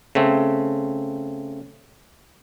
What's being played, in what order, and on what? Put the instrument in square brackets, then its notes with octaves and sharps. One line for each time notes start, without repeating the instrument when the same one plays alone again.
[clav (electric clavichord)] C#3 A3 C4